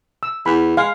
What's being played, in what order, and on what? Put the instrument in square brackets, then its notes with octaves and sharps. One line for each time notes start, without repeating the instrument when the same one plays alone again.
[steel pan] E6
[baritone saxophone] E2 [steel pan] B5
[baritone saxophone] G#3 [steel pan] F5